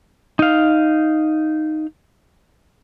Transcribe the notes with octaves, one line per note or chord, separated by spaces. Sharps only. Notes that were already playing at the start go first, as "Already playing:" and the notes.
D#4 F5